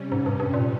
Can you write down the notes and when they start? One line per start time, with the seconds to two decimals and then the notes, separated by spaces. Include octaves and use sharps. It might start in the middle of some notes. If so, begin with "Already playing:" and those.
Already playing: C3 G3 C#4
0.12 G#2
0.26 G2
0.40 G2
0.54 A#2